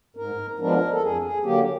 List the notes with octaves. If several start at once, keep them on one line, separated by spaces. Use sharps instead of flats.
G#2 A#4
F3 G#3 B3 D4 A#4
A4
F2 G#4
G#4
D3 F#3 A#3 G4